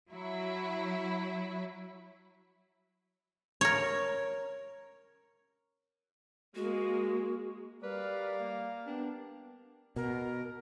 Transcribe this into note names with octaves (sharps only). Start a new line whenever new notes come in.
F#3 E4
A#4 C#5
G#3 A#3 F#4
G3 A#4 B4 D5 F5
A#3
B3 D4 G4
B2 A#4